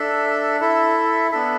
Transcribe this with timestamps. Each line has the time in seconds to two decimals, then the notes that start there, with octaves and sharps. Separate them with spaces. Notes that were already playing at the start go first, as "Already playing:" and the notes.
Already playing: D4 A4 E5
0.61 E4 A4 E5
1.31 B3 D4 A4 E5